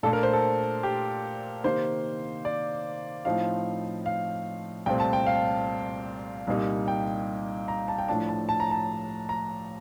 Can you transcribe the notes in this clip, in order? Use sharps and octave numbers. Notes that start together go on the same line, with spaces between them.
A#2 A3 D4 A4
A#4
C5
A4
G4
C3 D#3 A#3 C5
D5
A2 F3 C4 D#4 F5
F5
C2 A#2 A3 C4 G5
A5
G5
F5
C2 A#2 G3 A#3 D#4
G5
A#5
A5
G5
A2 F3 A3 D4 A5
A5
A5
A#5
A5
A#5